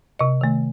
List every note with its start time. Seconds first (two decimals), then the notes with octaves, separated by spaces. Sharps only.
0.19 C3 D#5
0.41 D#3 A3